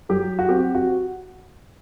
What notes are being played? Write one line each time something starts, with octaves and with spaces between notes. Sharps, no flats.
F#3 G4
F#4
C4 G4
F#4